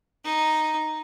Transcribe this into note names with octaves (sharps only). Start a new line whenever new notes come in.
D#4